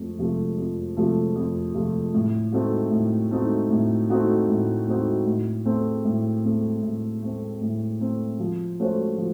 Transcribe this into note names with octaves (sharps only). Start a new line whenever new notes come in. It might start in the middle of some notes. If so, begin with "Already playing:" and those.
Already playing: F2 A3
C3 F3 A3
F2
C3 F3 A3
F2
C3 F3 A3
A2
A3 C4 D#4 F#4
A2
A3 C4 D#4 F#4
A2
A3 C4 D#4 F#4
A2
A3 C4 D#4 F#4
A2
A3 C4
A2
A3 C4
A2
A3 C4
A2
A3 C4
F3
A3 C#4 F#4 C5
F3